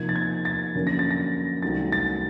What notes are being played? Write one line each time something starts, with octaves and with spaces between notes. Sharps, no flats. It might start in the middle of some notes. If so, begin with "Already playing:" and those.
Already playing: C3 F3 A#3 D#4 G#6
A6
G#6
A6
F2 D3 F#3 A#3 C#4
A#6
A6
A#6
C2 C3 D#3 F#3 A3 A6
A6